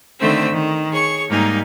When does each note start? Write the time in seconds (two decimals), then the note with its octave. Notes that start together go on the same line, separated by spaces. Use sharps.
0.19 D3 D#3 A3 C4 C5 E6
0.52 D#3
0.90 G#4 C#5 C#6
1.28 G#2 G3 A#3 D#4 G#5